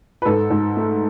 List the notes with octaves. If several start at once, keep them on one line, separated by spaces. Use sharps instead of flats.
B4
G#2 A4
G#2
A3